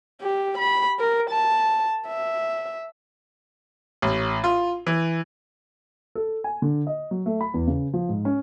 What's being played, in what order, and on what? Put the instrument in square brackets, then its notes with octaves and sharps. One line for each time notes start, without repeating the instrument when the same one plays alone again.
[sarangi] G4
B5
A#4
A5
E5
[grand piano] A1
F4
E3
A4
G#5
D3
D#5
F#3
A3
B5
E2
C#3
F3
G#2
C#4